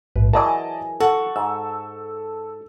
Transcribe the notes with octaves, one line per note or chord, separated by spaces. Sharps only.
A#1 G#2 B4
E3 F#3 G#4 A#4 D5 D#5 G#5 A5
F#4 A4
G#2 E6